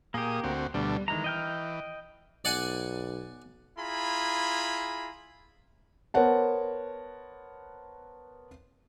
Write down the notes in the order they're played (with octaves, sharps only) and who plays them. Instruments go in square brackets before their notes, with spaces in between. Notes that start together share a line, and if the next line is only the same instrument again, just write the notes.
[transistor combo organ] A#2 G#4 D#6 [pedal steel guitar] A#3 G4
[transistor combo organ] D2 C4 F#4
[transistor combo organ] D2 B2 D4 [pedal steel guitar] G3
[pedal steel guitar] D#3 G#3 A#5 [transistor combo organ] E3
[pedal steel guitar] D#5 G5 F6
[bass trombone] B1 [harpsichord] D5 F#5 G#5
[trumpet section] E4 F4 G#4 A#5 B5
[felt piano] B3 A#4 C5 C#5 F#5 A5